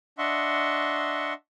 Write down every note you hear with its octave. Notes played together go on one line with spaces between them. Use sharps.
D4 D#5 E5 F#5 C6 C#6